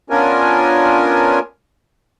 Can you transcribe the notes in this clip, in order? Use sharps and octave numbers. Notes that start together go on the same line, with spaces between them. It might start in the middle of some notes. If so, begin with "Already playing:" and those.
B3 C#4 D4 F4 A#4 G#5